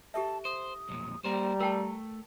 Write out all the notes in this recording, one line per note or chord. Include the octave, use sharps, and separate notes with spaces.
G4 A4 E5 A5
C5 D#6
B1 F2 A#2
G3 A#3 C5 A#5
A3 A#4 G5 A5